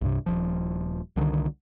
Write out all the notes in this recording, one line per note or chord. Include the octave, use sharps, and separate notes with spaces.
C2 G2 C3
D#1 A#1 F3
C2 D3 D#3